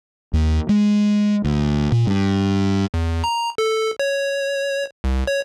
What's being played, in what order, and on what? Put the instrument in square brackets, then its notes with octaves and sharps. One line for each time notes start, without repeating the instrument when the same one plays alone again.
[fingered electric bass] D#2
G#3
D2
A#2
G2
[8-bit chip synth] E2
A#5
A4
C#5
C2
C#5